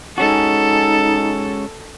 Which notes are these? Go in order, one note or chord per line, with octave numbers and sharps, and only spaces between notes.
G#3 C#4 D#4 F#4 A4